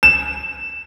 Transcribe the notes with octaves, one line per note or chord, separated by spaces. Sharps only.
E7